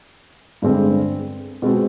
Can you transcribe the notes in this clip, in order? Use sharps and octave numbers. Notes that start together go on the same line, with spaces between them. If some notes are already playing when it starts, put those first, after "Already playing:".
G2 D3 G#3 C4
B2 G#3 C4